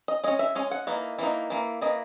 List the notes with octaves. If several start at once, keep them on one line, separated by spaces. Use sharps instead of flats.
D#5
G#3 C#4 D#5
E5
G#3 C#4 G#4
F#5
E3 A#3 D#4
E3 A#3 D#4
E3 A#3
E3 A#3 D#5